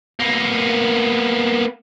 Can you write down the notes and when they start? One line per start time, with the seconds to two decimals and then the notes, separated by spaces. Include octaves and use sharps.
0.20 A#3 B3